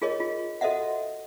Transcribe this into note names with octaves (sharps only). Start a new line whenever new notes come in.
F4 G#4 A#4 C#5 D#5
F4
F#4 A4 C5 D#5 E5 F#5